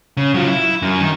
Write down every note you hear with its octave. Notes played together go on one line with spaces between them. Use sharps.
C#3
F#3 F4
E4
F#2
D#3